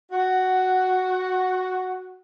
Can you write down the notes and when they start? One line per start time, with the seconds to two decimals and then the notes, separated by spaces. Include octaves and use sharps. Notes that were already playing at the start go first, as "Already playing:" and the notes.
0.11 F#4 F#5